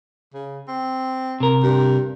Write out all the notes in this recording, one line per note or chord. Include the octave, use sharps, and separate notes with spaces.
C#3
C4
C3 A#4
G2